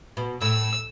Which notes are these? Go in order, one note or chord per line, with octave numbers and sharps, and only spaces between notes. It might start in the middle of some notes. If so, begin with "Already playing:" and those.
B2
A2 E6